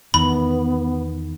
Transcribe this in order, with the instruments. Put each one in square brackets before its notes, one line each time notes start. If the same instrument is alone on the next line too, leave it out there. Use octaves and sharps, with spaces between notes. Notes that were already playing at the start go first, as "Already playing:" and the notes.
[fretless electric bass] E2 D#3 [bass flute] B3 [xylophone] B5